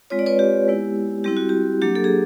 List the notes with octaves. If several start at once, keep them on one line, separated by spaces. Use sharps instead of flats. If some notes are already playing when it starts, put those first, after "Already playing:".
G#3 C4 F4 C#5
D5
B4 C#5
G4
G#3 B3 E4
G3 C4 E4 G4
F#4
G4
F#3 A#3 D4 G4
A4
G#4